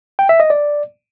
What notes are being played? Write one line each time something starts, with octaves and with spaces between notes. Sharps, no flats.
G5
E5
D#5
D5